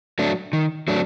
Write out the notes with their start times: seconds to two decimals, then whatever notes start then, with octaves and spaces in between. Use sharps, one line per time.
0.19 F#3 A3 D4
0.53 D#3
0.88 F#3 A3 D4